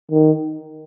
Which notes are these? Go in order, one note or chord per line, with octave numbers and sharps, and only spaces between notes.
D#3